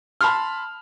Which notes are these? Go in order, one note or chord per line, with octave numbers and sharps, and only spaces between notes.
A5 B5 C6 F6